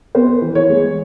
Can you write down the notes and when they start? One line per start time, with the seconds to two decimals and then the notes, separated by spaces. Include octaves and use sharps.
0.15 B3 C5
0.42 E3
0.55 C#5
0.70 G#3